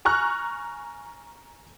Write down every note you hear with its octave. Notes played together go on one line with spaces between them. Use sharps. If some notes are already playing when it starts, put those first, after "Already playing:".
G#5 A#5 C#6 F6 F#6